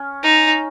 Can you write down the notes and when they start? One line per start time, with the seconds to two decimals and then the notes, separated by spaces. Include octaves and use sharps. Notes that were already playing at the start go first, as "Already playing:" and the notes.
Already playing: C#4
0.23 D#4